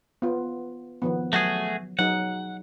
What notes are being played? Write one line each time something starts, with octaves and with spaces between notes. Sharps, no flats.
B3 F4
D#3 F3 B3
F#3 A3 F#4 G#4
F#3 D#4 G#4 F#5